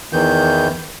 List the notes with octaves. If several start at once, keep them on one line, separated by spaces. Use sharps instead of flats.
E2 D#3 E3 G6